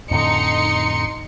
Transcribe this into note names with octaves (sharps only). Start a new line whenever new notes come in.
F2 A2 D3 D#4 C6 C#7